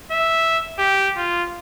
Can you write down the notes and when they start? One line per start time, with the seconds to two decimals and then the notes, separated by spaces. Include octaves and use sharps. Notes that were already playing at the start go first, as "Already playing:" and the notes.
0.11 E5
0.79 G4
1.17 F4